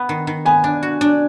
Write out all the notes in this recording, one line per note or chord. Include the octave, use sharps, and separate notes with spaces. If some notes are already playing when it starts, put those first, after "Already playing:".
Already playing: B3
D#3
D#3
B3 G#5
D4
F#4
D4